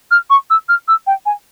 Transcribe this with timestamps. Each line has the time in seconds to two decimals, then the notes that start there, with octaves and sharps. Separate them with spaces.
0.11 F6
0.30 C#6
0.50 E6
0.69 F6
0.88 E6
1.07 G5
1.26 G#5